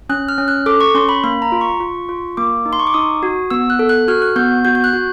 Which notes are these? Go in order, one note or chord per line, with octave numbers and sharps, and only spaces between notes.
C#4 F#6
F6
C#4
F#6
A4 D6
C#6
C#4 C6
B5
A#3 B5
A#5
F4
C#6
F4
F4
A#3 D6
D#4
C6
C#6
D6
D#4 D#6
F#4
B3 E6
F#6
A4
F#6
F#4 F6
F#6
B3 G6
F#4 G6
G6
F#6
F#4